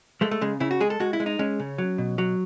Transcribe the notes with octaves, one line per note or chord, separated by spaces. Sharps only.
G#3 A3
A3
C#3 G#3
C#3 E4
F#4
G#3 G#4
A4
G#3 F#4
E4
G#3
D#4
G#3 C#4
C#3
F#3
B2
F#3